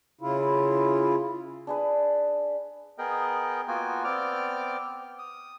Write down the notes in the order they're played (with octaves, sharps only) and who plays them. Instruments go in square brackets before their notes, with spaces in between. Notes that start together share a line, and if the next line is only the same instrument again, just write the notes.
[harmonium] C#3 E4 F4
[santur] D4 G#4 B4
[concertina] B3 G#4 A#4 D#5 G5
A#3 B3 F4 F#4 G5 G#5
B3 C4 D5 G5 D6 F6
D#6